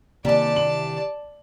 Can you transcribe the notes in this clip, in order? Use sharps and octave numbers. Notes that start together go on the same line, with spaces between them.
C3 D#3 E3 G3 A#3 D4 D5 A5
F#7